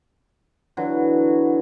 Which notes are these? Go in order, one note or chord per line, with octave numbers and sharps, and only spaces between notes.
D3 E3 F#3